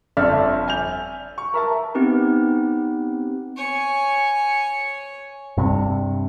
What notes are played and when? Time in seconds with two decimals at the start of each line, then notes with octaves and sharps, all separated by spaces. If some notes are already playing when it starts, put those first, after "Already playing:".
0.17 G1 F2 A4 D5 E5 F6
0.67 G#5 G6 F7
1.38 C#6
1.54 A#4 E5 A5
1.95 B3 C4 D#4 G4 B4
3.57 C#5 G#5
5.57 G2 C3